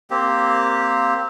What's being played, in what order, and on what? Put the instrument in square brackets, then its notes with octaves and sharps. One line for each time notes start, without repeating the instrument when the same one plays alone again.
[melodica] A#3 C4 G4